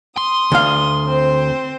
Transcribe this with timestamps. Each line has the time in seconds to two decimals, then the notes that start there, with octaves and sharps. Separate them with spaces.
0.17 C6 D#6
0.52 D2 F5
1.03 C4 C5